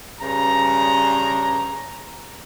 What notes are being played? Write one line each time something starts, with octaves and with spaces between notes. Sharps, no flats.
G2 C#3 A#5